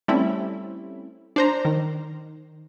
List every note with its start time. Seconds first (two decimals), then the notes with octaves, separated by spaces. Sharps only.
0.08 G3 A3 C4 C#4 E4
1.36 D4 C5 A#5
1.65 D#3